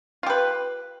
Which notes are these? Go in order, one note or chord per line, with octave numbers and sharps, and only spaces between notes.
F4 G4 B4